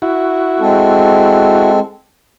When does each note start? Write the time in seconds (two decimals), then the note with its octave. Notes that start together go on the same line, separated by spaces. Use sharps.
0.02 E4 F#4
0.60 G#3 C4 A4